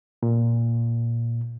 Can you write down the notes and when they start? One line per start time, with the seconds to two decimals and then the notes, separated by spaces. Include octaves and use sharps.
0.23 A#2